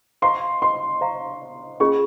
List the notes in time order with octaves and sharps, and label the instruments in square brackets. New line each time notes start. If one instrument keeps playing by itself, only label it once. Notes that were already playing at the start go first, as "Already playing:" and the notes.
[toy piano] C5 F5 A#5 C#6 [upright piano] C6
[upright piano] C6
[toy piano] C5 F5 A#5 C#6
[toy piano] C#4 F4 G#4 [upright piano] C#6